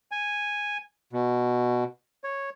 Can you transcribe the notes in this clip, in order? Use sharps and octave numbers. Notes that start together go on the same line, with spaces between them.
G#5
B2
C#5